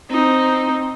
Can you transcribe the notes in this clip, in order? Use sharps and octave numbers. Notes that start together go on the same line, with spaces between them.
C4 D#4